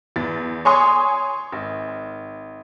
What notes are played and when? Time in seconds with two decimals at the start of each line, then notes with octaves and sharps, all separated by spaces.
0.16 E2 A6
0.65 C#5 G#5 C6 C#6 D#6
1.52 G#1